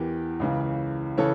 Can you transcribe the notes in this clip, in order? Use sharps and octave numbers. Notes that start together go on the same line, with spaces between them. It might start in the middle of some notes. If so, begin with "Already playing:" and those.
Already playing: E2 E3 G4 A#4
C#2 C#3 E3
C#3 E3 A4 C#5